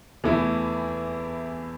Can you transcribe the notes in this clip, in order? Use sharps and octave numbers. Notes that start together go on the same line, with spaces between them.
E2 E3 A3 E4